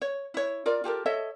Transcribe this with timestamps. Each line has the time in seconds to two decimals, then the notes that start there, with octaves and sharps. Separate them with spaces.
0.02 C#5
0.34 E4 C#5
0.66 F4 A#4 D5
0.84 F4 G4 A4 A#4
1.06 A4 C#5 D#5 E5